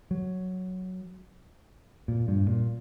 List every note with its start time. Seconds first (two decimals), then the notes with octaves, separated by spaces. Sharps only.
0.11 F#3
2.08 A#2
2.28 G2
2.48 A#2